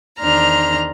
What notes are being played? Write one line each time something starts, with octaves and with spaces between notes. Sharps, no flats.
E2 D#3 D4 C5 A#5 F6